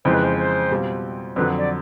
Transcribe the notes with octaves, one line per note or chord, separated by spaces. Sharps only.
F2 C#3 E3 G#3 C5
B4
C5
C5
B2 G3 C4 F4
F2 D3 F#3 B4
D5